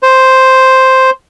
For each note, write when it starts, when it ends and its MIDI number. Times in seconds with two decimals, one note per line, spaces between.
0.03 1.10 72